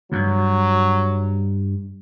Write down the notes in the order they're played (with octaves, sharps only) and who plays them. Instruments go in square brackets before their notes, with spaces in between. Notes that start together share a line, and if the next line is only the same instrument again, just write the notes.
[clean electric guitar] D2 G2 [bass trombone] F#3